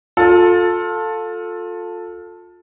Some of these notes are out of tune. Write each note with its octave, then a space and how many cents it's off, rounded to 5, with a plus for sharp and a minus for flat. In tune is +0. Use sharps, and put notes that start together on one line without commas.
F4 +25 A4 +5